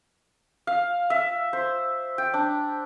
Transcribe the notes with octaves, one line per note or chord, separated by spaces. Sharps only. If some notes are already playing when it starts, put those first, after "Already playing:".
F5
E5
C5
G5
D4